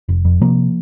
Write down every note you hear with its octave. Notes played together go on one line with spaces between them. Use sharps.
F1
F2
C3 F3 A#3